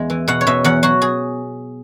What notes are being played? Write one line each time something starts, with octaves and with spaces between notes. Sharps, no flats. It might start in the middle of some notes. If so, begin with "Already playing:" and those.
Already playing: E2 G#3 B3
E3
B2 F#5
C#5
B2 E5
E2 F#5
F#3 F#4
G#4